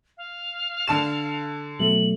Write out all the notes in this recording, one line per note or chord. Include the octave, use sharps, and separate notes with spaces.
F5
D3 A5 E7
B2 F#3 A3 F#7